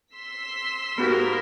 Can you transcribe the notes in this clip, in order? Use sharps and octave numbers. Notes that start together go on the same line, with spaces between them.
C6 E6 B6
G#2 A#3 B3 F#4 G4 A#4